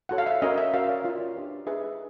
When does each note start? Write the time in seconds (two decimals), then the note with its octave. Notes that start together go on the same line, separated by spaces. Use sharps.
0.09 F#4 A4 C#5 F#5
0.18 F5
0.27 E5
0.42 C#4 F#4 A#4 C#5 D#5
0.58 E5
0.74 F#4 A#4 C#5 F5
0.89 D5
1.05 F4 A#4 C#5
1.36 D4 G4 B4
1.67 D#4 G#4 B4 E5